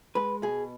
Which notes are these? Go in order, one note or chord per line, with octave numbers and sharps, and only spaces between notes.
G#3 B4
B2 G#4